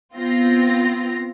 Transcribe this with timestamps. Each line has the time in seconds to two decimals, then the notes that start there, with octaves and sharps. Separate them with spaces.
0.15 B3 C4 F4 A#6